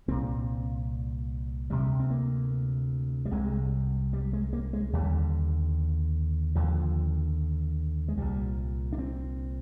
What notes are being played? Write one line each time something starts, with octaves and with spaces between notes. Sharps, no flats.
C2 A#2 C4
D2 C3 G3
C4
A#3
G3
C2 C3 G#3
G3
G#3
A#3
G#3
D#2 D3 G3
D#2 D3 F3
G#3
C2 A#2 G3
D4
C4